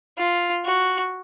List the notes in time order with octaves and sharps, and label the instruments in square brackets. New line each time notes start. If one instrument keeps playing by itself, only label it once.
[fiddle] F4
F#4